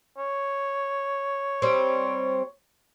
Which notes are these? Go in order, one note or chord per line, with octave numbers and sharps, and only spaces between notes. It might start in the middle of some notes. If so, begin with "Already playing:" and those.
C#5
G3 C4